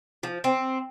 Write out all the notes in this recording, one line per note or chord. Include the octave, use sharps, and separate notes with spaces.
F3
C4